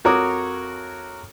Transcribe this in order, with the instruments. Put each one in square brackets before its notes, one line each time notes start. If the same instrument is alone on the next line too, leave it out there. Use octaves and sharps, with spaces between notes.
[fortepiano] F2 F#4 A#4 C#5 D6 D#6